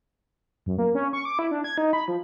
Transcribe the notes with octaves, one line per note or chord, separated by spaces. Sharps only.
F#2
A#3
C#4
C#6
D6
E4
D4
G#6
D#4
B5
F3